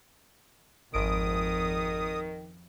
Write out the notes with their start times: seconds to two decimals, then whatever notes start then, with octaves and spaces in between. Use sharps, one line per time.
0.94 G#1 F2 D#3 D#6 D7